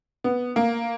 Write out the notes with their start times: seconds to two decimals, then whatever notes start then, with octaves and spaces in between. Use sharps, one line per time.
0.24 B3
0.56 A#3